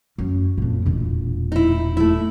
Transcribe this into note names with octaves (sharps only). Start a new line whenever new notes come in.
F#2
F2 A#2
E1 A#2
D#4 E4
A3 E4